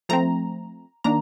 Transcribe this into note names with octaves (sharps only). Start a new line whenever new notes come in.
F3 A3 C4 A#5
D#3 A#3 D4 A#5